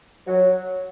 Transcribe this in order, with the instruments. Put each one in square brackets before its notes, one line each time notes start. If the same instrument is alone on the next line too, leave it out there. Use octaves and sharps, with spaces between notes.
[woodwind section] F#3